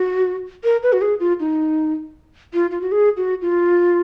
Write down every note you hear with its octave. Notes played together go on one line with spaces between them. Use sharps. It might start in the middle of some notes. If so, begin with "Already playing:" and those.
Already playing: F#4
A#4
B4
F#4
G#4
F4
D#4
F4
F4
F#4
G#4
F#4
F4